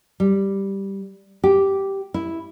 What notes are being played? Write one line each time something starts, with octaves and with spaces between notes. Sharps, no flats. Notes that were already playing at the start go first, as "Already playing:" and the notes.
G3
G4
E4